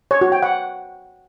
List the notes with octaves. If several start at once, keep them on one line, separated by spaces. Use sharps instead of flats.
C#5
F#4
G5
F#5